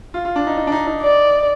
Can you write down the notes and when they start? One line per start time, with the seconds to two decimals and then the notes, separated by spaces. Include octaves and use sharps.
0.14 F4
0.25 F4
0.36 D4
0.47 D#4
0.57 D#4
0.67 D4
0.72 D#4
0.87 D#4
1.01 D5